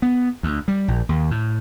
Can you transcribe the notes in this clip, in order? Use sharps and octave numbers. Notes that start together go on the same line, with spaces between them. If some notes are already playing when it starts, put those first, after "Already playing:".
B3
D2
G3
A#1
D#2
A2